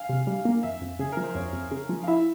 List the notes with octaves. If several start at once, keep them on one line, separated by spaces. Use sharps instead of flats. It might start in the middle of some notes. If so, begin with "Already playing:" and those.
Already playing: F5 G#5
C3
G3
A#3
F2 E5
F2
C#3 G#4
F3 A#4
C5
F2 C#5
F2
C#3
F3
F5
E4 E5